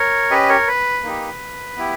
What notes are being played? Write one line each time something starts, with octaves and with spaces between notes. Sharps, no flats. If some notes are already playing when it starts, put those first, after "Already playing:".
Already playing: A#4 C#5
C#4 G4 B4 D#5
A#4 C#5
B4
A#3 D#4 G4
B3 E4 G4